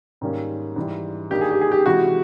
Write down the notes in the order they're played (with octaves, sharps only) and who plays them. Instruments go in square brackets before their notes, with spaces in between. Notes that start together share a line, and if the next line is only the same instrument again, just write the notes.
[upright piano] G#2 D#3 G3 A#3 C#4
G#2 E3 G3
G2 D#3 G3 A#3 D#4 G4
G#4
G4
G#4
G4
C3 E3 G#3 F#4